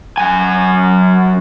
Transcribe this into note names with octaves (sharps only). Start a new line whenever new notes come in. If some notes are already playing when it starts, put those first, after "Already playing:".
F#2 G#5